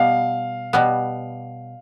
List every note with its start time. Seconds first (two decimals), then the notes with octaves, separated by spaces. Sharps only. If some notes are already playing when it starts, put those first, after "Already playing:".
Already playing: B2 G3 B3 F5
0.73 B2 G3 B3